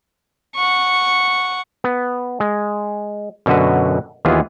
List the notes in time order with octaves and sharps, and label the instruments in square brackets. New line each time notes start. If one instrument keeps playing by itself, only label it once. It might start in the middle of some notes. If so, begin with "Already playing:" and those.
[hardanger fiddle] F#5 C#6
[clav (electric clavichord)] B3
G#3
F#2 B2 D3 F#4 B4
D#2 E3 B3 F4 G#4